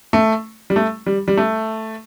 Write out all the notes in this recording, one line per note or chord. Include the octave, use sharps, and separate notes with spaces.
A3
G3
A3
G3
G3
A3